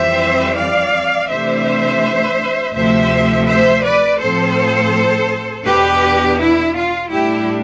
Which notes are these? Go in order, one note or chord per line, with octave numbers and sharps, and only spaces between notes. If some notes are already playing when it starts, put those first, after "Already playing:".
Already playing: F2 E3 G3 C4 C5 E5
D5 F5
C3 E3 A3 D4 C5 E5
D2 C3 F3 A3 C5 E5
C5 E5
B4 D5
A2 F3 C4 A4 C5
E2 B2 B3 D4 G4 B4
E4
F4
A2 G3 D4 E4 G4